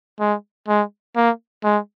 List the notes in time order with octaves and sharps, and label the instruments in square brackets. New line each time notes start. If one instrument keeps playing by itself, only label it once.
[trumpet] G#3
G#3
A#3
G#3